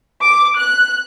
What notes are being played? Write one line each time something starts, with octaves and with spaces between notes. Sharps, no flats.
D6
F#6